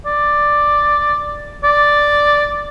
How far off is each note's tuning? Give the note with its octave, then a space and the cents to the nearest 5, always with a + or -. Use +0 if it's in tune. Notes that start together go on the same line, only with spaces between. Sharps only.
D5 +5
D5 +0